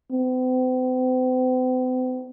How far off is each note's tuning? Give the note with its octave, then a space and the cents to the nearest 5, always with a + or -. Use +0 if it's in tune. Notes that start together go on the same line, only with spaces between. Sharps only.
C4 -45